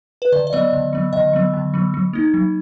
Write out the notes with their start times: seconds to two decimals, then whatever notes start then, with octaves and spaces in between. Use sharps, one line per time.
0.22 B4
0.32 D3 D5
0.47 D5
0.53 F#3 B3 D#5
0.73 D3
0.93 F#3 B3
1.13 D3 D#5
1.33 F#3 B3
1.54 D3
1.74 F#3 B3
1.94 F#3
2.13 A#3 D#4
2.34 F#3